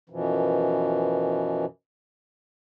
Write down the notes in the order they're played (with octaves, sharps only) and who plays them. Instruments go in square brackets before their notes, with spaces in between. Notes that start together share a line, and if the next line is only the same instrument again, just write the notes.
[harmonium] F#2 B2 E3 F3